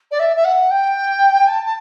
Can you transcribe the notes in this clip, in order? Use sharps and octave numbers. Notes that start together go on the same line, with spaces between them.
D5
E5
E5
F#5
G5
A5
A5